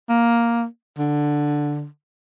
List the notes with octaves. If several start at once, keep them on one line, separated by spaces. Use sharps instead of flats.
A#3
D3